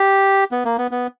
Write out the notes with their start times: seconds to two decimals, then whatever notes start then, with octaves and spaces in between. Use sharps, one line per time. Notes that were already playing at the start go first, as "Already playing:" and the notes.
Already playing: G4
0.52 B3
0.65 A#3
0.78 B3
0.91 B3